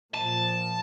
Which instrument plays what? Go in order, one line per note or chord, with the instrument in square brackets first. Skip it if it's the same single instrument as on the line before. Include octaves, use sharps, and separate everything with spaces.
[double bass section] A#2 F3 [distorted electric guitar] A5